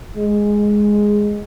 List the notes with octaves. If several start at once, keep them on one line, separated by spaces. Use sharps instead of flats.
G#3